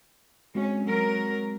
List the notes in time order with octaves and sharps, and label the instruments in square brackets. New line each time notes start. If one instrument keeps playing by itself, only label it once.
[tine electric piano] G#3 C4 F#4 [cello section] C#4
[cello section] F#3 A#4